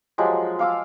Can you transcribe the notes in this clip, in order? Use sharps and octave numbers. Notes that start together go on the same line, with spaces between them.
F3 F#3 G#3 G4
F5 D6 E6